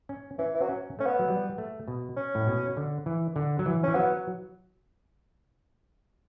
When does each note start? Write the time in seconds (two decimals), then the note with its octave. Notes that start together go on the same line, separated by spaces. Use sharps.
0.09 C#4
0.38 E3 C#4
0.55 E3
0.62 F#3
0.69 C#4
0.99 A3 C#4
1.06 B3
1.19 F#3
1.28 G3
1.58 A3
1.88 B2
2.17 C#4
2.35 A2
2.47 B2
2.77 D3
3.06 E3
3.36 D3
3.59 F#3
3.66 E3
3.84 E3 C#4
3.95 F#3 B3